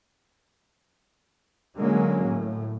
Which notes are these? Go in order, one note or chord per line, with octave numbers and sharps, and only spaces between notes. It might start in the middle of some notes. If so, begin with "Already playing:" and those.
D3 F#3 G#3 A#3 C#4
A2